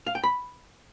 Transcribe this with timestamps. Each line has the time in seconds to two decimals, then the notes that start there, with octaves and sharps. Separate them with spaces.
0.07 F5
0.15 G5
0.24 B5